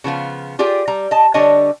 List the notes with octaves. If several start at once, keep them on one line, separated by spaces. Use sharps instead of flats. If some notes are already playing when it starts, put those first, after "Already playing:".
C#3 F3 B3 F4
F4 G4 G#4 D5 G5
G3 A#5
D#5 A5
D3 G3 D4 C#5 D#5 G#5